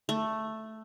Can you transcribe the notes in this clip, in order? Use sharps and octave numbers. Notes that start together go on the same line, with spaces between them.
A3